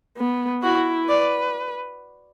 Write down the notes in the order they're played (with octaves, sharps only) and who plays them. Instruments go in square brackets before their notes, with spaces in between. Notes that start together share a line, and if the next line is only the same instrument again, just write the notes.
[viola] B3
[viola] E4 [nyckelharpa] F#4
[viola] B4 [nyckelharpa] D5